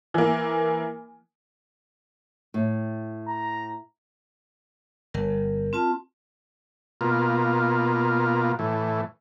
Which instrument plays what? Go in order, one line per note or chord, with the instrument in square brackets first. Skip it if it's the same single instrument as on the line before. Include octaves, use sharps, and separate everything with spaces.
[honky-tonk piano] E3 A#3
[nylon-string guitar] A2
[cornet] A#5
[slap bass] G1 [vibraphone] A#4
[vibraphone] C4 F4 A5
[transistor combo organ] B2 A#3 F4
A2 E3